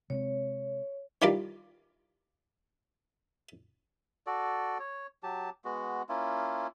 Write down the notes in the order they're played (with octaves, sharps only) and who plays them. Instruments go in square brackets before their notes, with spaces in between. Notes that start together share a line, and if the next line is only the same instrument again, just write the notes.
[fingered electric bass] C3 G#3 C4 [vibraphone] C#5
[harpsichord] D#3 E3 G3 F4 A#4 D5
[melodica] F#4 A4 D5
C#5
F#3 G4 A5
G#3 B3 F#4
A#3 C#4 E4 F4